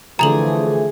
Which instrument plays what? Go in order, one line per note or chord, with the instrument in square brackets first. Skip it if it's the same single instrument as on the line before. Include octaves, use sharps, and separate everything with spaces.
[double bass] D3 [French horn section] E3 F3 A3 [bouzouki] G#4 [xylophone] A#5 F7 F#7